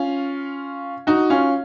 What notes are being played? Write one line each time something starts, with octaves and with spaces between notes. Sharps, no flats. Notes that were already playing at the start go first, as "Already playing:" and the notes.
Already playing: C#4 F4
D#4 F#4
C#4 F4